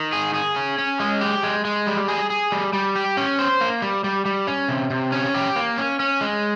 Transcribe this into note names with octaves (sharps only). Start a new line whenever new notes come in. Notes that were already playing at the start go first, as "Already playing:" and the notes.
Already playing: D#3
G#4
G#4
C#4
C#4
G#3
G4
G#3
G#3
G3
G#4
G#4
G3
G3
G4
C#4
C5
A#3
G3
G3
G3
C#4
C3
C3
C#4
G4
A#3
C#4
C#4
G#3